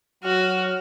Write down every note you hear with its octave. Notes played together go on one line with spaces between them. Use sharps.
F#3 F#4 F6